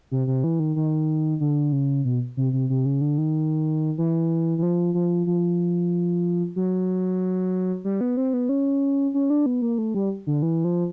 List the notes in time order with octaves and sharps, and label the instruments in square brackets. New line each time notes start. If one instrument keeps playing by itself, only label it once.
[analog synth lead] C3
C3
E3
D#3
D#3
D3
C#3
B2
C3
C3
C3
C#3
D3
D#3
E3
E3
F3
F3
F3
F#3
G3
B3
C4
B3
C#4
C#4
D4
B3
A#3
A3
G3
D3
E3
F3